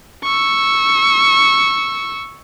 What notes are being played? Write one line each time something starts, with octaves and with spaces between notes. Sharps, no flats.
C#6 E6